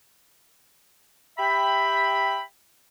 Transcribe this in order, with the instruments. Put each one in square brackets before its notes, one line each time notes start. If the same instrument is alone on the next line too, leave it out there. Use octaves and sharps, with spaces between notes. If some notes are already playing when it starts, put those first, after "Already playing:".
[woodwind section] G4 E5 G5 B5